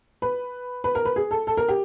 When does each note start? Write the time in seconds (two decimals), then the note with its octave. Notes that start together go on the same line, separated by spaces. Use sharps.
0.22 B4
0.84 B4
0.95 A#4
1.05 B4
1.16 G#4
1.31 A4
1.47 A4
1.57 A#4
1.68 G4